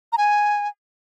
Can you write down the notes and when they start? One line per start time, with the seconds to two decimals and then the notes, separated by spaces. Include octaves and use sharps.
0.13 A#5
0.18 G#5